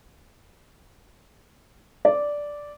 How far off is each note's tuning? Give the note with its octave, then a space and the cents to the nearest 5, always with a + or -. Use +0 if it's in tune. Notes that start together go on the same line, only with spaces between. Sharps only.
D5 -5